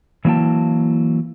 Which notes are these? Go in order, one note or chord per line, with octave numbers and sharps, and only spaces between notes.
E3 F#3 A#3 E4 G5 A5